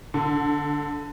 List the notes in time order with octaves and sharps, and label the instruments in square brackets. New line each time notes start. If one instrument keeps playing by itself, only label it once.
[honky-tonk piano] D3